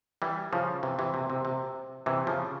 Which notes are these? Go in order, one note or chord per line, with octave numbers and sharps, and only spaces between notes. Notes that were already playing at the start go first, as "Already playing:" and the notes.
E3 G3
C#3 F3
C3 E3
C3 E3
C3
C3
C3
C3 E3
C#3 F3